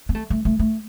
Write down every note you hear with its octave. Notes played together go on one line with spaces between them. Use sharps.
B3
A3
A3
A3
A3